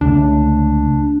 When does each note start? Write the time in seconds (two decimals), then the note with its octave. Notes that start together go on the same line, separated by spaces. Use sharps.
0.01 C#2 D3 A3 D4